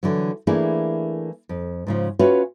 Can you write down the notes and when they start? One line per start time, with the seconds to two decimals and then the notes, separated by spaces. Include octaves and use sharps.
0.03 D3 E3 F#3
0.47 E3 A3 A#3 D4 E4 G#4
1.49 F2
1.87 G#2 C#3 F3
2.19 C#4 F4 F#4 B4 C#5 E5